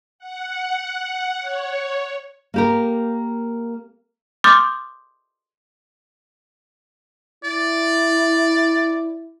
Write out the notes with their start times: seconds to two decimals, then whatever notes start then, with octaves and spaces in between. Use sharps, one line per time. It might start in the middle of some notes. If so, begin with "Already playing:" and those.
0.19 F#5
1.40 C#5
2.54 A#3 G4 A#4
4.44 C6 D6 D#6 F6 G6 A6
7.44 E4 D5